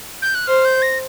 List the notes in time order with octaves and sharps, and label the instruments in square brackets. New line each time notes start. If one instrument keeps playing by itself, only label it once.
[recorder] G6
F#6
[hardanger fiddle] C5 [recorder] F6
[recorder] G6
A#6